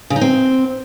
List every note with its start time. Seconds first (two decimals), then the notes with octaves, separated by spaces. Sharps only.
0.10 C#3
0.16 D#4
0.21 C4